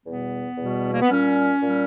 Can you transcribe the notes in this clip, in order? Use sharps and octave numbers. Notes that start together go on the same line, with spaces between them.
E2 B2 G3 B3
E2 B2 G3
A#3
B3
A#2 G3 C#4
A#2 G3